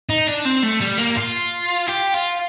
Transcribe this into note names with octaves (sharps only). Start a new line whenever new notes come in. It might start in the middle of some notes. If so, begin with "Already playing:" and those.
D#4
D4
C4
A3
G3
A#3
F4
G4
F4